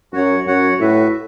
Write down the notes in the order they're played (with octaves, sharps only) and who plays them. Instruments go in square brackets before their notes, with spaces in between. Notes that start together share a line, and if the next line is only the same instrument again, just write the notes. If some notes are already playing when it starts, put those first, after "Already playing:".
[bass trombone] F#2 [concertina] F#4 C#5 F#5
[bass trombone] F#2 [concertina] F#4 C#5 F#5
[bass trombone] A2 [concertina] F#4 B4 E5